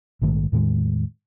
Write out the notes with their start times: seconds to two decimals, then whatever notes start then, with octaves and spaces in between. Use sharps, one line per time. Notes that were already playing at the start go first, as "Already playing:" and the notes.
0.22 A#1 G#2 D#3 A3
0.52 E2 A2 D#3 G#3